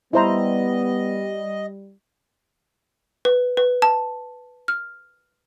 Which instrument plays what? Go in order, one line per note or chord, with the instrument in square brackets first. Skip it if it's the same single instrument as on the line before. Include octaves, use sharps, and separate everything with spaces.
[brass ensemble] G3 [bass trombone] B3 [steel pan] E4 C5 A#5 [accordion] D#5
[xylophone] B4
B4
A5
F6